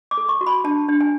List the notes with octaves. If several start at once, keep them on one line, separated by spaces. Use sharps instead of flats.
D6
A4
C#6
F#4
B5
D4 A5
D4
G#5